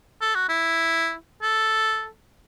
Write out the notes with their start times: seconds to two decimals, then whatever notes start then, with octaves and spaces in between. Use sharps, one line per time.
0.21 A4
0.35 F#4
0.49 E4
1.42 A4